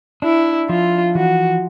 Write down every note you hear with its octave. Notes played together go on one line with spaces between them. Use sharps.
D4 E4
F3 F4
E3 F#4